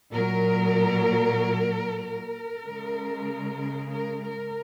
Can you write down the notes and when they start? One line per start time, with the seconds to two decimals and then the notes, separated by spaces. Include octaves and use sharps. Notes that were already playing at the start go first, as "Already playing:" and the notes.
0.11 A#2 F#3 A#4
2.02 A#4
2.64 C#3 G#3
3.91 A#4
4.22 A#4